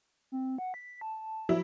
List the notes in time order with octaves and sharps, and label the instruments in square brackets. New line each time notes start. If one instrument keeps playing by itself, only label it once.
[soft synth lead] C4
F#5
B6
A5
[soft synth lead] F3 [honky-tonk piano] F#3 E4